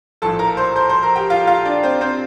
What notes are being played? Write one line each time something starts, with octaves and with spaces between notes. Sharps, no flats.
A#1 A2 F3 A4 A5
A#4 A#5
C5 C6
C5 C6
C5 C6
A#4 A#5
G4 G5
F4 F5
F4 F5
D4 D5
C4 C5
C4 C5